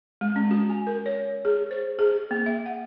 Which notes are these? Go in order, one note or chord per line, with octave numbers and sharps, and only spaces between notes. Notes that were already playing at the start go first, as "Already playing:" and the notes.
G#3
C#4
F#4
G#5
A#4
C#5
G#4
C5
G#4
A#3
E5
F#5